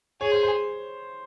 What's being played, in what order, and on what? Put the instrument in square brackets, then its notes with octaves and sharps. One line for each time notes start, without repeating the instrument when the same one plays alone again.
[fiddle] G#4 [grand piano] C#5
[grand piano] C5
C5